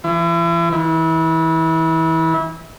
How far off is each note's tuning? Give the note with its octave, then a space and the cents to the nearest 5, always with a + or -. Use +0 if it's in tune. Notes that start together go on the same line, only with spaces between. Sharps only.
E3 +35
E3 -30